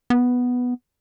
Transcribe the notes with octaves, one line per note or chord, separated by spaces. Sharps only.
B3